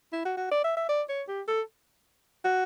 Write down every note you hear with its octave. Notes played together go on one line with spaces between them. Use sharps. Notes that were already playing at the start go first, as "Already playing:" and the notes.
E4
F#4
F#4
D5
E5
E5
D5
C#5
G4
A4
F#4